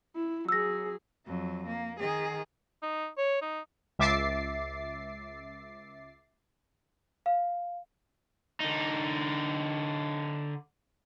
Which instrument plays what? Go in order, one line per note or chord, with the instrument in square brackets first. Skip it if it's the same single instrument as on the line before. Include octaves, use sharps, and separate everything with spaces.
[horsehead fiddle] E4
[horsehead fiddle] F#3 G#4 [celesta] E6 A#6
[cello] F2 F#3
A#3
D#3 G#4
[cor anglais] D#4
C#5
D#4
[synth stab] C#2 E5 D6 A6 C7
[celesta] F5
[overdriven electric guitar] D3 D#4